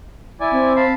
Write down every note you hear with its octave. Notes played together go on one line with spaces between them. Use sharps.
E4 D5 G#5
C4
F5 A5 B5